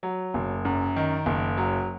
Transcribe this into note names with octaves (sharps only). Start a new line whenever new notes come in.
F#3
F#1
F#2
D#3
F#1
F#3